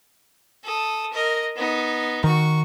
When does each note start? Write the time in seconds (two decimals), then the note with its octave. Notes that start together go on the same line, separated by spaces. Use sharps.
0.64 A4 D#6
1.13 A#4 D#5
1.56 B3 D#4
2.24 D#3 F#4 C#6